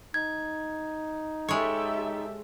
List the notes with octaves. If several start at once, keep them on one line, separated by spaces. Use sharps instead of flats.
D#4 G#6
G#3 G4 A4 C#5 E5